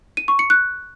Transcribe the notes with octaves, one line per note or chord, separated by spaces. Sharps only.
D#7
C#6
C#7
F#6